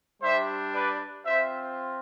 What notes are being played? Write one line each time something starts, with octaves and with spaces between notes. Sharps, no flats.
G3 D4 G4 C5 E5
B4 D5
C4 F4 C5 E5